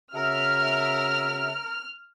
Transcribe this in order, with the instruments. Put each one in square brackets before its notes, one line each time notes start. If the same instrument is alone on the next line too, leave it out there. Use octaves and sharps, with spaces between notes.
[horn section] C#3 F#4 E5 [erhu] A#4 [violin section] F6